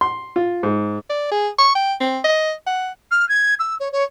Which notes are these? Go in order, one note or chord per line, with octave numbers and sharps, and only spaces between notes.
C6
F4
G#2
D5
G#4
C#6
G5
C4
D#5
F#5
F6
G#6
E6
C#5
C#5